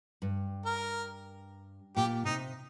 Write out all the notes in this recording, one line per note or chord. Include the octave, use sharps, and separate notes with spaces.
G2
A#4
A#2 G4
C3 D#4